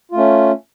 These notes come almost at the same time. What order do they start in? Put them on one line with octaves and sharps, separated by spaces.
F4 A3 C#4